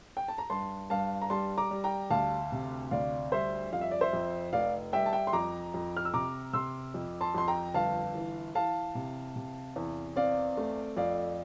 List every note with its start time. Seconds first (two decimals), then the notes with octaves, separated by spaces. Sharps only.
0.17 G5
0.28 A5
0.38 A#5
0.50 G2 A5 C6
0.90 G2 F5 A5
1.22 A#5
1.30 G3 A5 C6
1.58 A#5 D6
1.71 G3
1.84 G5 A#5
2.11 D2 F5 A5
2.52 C3
2.91 D2 D5 F5
3.32 G3 C5 E5
3.72 F2 F5
3.81 E5
3.91 D5
4.01 C5 E5
4.13 F2
4.53 F1 D5 F5
4.93 G3 E5 G5
5.06 A5
5.13 E5 G5
5.27 C6
5.33 F2 A#5 D6
5.74 F2
5.97 F6
6.05 E6
6.14 C3 A#5 D6
6.53 C3 C6 E6
6.94 F2
7.21 A5 C6
7.35 F2 C6
7.48 G5 A#5
7.74 G1 F5 A5
8.15 E3
8.55 E3 F5 A5
8.95 C3
9.36 C3
9.76 E2
10.16 C4 D5 F5
10.57 A3
10.97 F2 D5 F5